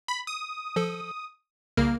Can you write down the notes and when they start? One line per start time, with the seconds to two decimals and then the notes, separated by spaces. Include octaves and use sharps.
0.08 B5
0.27 D#6
0.76 F3 A4
1.77 C2 C#3 A#3 F6